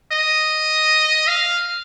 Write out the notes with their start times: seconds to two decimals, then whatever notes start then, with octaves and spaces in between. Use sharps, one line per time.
0.12 D#5
1.27 F5